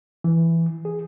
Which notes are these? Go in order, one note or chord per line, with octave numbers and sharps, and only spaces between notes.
E3
G#4